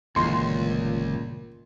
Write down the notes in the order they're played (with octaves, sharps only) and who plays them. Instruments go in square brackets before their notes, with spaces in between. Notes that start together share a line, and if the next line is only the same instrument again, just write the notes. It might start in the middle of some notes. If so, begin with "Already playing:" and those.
[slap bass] G1 E3 A3 [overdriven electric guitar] C#2 [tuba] A#2 [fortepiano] C6